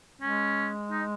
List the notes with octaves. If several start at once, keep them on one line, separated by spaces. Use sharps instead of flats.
G#3 C#4
D#4